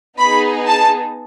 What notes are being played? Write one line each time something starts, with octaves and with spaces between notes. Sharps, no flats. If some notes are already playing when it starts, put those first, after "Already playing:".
B3 D#4 G#4 B5
A5